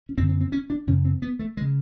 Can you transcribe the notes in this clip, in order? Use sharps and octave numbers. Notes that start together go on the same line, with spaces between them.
C#4
F#2 D3 C4
C4
C4
C#4
D4
F#2 C#3 C#4
C4
B3
A3
G#3
C#3